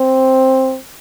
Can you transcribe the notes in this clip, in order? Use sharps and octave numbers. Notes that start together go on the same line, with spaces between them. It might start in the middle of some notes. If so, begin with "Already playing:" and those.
Already playing: C4